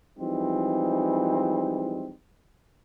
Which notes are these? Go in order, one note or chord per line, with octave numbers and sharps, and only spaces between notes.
E3 F3 G3 G#3 C4 D#4